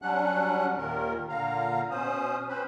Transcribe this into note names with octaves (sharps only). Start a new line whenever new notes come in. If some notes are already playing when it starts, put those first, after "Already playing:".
F#3 G3 C#4 D4 F#5 F#6
D#2 A#2 D#3 A#4
A#2 D3 F5 A#5
B2 C#4 C5 D#6
C4 C#4 B4 C5 B5